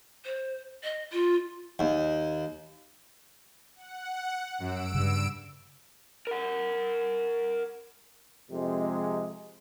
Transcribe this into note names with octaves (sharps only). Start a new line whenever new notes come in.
C5
D#5
F4
D#2
F#5
F#2 E6 D7
G2 C#3
A#4 F#5
F2 C3 G#3